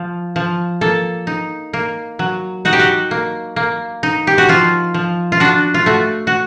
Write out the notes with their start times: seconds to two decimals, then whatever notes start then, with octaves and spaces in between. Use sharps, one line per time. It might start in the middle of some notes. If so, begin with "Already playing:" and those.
Already playing: F3
0.36 F3
0.81 A#3 A4
1.27 D#4
1.73 A#3
2.19 F#3
2.65 D#4 F#4
2.73 G4
2.79 F#4
3.11 A#3
3.56 A#3
4.03 D#4
4.27 G4
4.38 F#4
4.48 F3 F4
4.94 F3
5.32 F4
5.40 D4 F#4
5.74 F4
5.86 A3 F#4
6.27 F#4